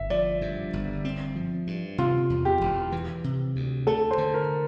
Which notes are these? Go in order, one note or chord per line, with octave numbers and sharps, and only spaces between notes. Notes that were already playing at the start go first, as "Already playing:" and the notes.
Already playing: G1 E5
F3 D5
G2
G1
C4
F3
G2
C3 F4
E2
G4
E1
E3
C3
D2
A3 A4
C5
D3
A#4